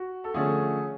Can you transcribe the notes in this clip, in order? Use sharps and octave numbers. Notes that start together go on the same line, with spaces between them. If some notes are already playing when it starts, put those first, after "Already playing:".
Already playing: F#4
A4
D3 F3 A3 C#4 G#4